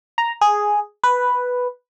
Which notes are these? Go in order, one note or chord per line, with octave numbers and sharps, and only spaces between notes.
A#5
G#4
B4